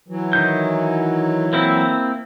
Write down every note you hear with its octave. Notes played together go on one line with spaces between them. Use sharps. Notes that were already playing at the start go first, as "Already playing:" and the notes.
E3 F#3
D#3 G6
A#3 C4 E4